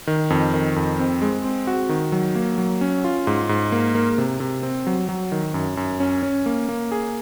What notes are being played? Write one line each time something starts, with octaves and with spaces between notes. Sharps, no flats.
D#3
F2
D#3
F2
C4
G#3
C4
F#4
D#3
F#3
A#3
F#3
C#4
F4
G#2
G#2
A#3
A#3
C3
C3
C4
F#3
F#3
D#3
F#2
F#2
C#4
C#4
A#3
A#3
G#4